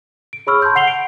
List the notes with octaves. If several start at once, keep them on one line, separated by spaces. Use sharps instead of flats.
D7
G#4 C#5 B5 C#6 E6 F6
A5 B5 C6 G6
F#5 C7 F7 G7
D7